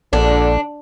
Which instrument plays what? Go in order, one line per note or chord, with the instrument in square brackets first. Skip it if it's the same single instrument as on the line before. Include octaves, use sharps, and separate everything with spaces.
[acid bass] A#1 [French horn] D3 [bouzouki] D4